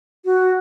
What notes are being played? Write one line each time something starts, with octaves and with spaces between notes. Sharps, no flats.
F#4